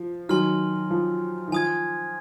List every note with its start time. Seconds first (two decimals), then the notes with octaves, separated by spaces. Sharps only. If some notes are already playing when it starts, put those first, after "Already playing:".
Already playing: F3
0.29 D#3 F#3 G#5 C6 F6
0.90 F3
1.48 D#3
1.52 F3 G#5 D#6 G#6